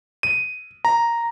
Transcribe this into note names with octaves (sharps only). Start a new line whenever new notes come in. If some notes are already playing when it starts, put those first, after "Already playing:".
D#7
A#5